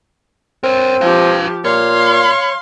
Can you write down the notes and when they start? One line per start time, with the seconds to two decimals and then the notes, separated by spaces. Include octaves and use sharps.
0.64 C4 A#4 C#5
1.01 F3 G4 B4 F5
1.65 A#2 C#5 F5 C6